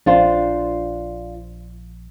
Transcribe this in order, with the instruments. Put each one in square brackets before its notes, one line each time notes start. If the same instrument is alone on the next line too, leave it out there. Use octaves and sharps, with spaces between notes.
[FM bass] A#1 [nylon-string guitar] D4 F4 C5